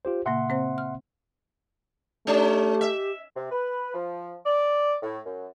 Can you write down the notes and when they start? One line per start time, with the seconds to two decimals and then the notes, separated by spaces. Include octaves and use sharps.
0.05 F4 G4 C5
0.26 A#2 C#3 A#3 E5 F#5 C6
0.49 C#3 C4 C5
0.78 F6
2.27 A3 C#4 G4
2.81 E5
3.35 C3
3.50 B4
3.93 F3
4.46 D5
5.03 A2
5.24 F#2